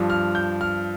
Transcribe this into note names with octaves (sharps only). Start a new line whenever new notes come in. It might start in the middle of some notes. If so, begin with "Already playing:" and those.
Already playing: G2 F3
F6
G6
F6